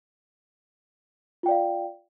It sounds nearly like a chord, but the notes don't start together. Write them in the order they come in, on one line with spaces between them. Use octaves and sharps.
F4 G5 D5 F5